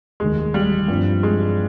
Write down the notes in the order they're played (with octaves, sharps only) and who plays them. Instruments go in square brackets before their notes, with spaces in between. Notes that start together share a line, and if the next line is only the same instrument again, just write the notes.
[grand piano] F1 D#2 D#3 [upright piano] G#3
[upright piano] G3
[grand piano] G2 F3 C4
[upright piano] G#3